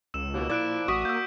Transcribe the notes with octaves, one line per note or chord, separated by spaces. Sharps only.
C#2 E6 E7
D#2 B2 A#3
A#2 F3 E4 D5 D6 F#6 D7
A1 F#4 C#6 D#6 B6
A#3 E6 G6